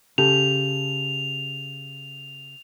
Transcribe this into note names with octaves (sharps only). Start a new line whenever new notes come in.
C#3 G4 A4 F7